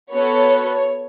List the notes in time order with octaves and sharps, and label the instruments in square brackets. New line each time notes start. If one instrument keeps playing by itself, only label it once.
[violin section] B3 F#4 A4 C#5